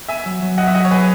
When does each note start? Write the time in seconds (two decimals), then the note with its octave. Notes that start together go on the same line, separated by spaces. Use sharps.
0.09 B3 E5 G#5
0.25 F#3
0.42 F#3
0.58 B3 D#5 F#5
0.67 E5
0.75 F#3 D#5 F#5
0.85 C#5
0.91 F#3 G#4 B4